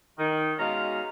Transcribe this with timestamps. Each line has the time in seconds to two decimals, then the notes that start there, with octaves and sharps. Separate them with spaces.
0.18 D#3
0.58 B2 G#3 C#4 D#4 F5 A#5